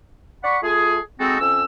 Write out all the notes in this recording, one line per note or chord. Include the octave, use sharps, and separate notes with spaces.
D5 F#5 B5 C#6
A3 F4 G#4
G#3 C4 D#4 F#4 A4
F2 C#4 E6